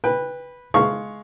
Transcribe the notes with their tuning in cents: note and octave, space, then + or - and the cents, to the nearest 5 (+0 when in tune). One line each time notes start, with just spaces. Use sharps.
B4 -5 G5 +30
G#3 +15 F5 -5 C#6 +0